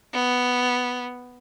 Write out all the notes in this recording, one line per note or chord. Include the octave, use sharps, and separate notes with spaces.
B3